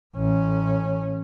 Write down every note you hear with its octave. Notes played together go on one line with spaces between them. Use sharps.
A1 C#4